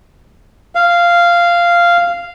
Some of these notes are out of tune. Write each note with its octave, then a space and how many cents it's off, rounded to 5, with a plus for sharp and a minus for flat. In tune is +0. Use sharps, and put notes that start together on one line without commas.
F5 -10